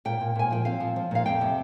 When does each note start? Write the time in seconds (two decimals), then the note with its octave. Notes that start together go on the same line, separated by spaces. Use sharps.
0.05 A#2 G5
0.21 A#2
0.36 A#2 G#5
0.51 F3 G5
0.65 C4 F5
0.80 F3
0.96 F3
1.11 A#2 F5
1.26 F2 G5
1.41 C3